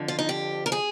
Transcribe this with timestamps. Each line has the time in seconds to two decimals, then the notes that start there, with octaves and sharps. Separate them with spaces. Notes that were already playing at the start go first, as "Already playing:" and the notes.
Already playing: F2 D3 F3
0.08 F4
0.19 D#4
0.29 G4
0.66 A#4
0.72 G#4